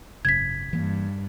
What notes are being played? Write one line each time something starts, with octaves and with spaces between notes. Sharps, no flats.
G#1 F#2 C#3 G#6 B6
G2 E3 A#3